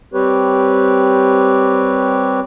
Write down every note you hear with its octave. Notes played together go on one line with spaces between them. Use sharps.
G3 C4 G4 B4 C#5